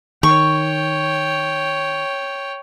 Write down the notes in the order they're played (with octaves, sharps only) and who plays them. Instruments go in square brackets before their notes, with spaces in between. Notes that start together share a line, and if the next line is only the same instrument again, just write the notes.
[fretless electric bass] D#3 [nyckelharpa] C#5 G5 [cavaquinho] C#6